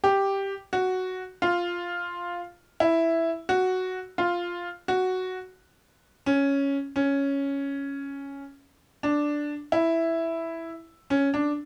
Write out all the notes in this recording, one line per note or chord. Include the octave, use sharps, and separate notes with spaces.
G4
F#4
F4
E4
F#4
F4
F#4
C#4
C#4
D4
E4
C#4
D4